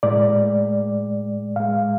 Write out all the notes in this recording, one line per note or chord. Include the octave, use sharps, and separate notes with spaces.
A2 G#3 D5
A2 G#3 F5